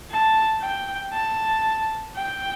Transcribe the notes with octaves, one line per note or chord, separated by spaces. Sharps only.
A5
G5
A5
G5